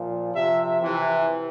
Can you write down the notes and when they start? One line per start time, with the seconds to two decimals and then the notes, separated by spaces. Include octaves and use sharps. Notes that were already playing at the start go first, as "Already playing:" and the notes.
Already playing: A#2 F3
0.34 C3 F3 E5
0.82 C3 E3